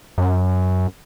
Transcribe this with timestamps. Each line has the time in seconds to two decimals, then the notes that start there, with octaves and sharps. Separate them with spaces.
0.18 F#2